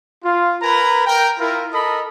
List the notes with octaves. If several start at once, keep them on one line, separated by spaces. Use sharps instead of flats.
F4
A#4 B4 G#5 A#5 B5
A#4 G5
E4 F4 A#4
A4 A#4 D#5 B5 D#6